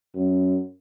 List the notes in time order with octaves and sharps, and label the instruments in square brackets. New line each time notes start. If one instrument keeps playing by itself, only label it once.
[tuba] F#2